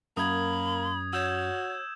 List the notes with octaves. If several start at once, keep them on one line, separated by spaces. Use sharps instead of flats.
F#2 A#3 B5 D#6 G#6
F#4 C#5 E6 G6 E7